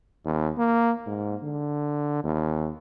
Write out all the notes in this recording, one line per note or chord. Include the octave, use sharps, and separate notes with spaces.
D#2
A#3
G#2
D3
D#2